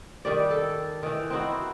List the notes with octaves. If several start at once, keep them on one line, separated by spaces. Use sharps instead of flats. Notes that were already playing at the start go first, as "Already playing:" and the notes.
D#3 G3 D5
A4
D#3 E3
C4 D#4 E4 F#4